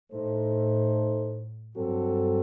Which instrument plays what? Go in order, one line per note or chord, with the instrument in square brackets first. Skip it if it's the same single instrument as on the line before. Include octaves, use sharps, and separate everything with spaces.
[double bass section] A2 [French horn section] A3 D#4 A4 C5
[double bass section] G2 [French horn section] F#3 C4 F#4 A4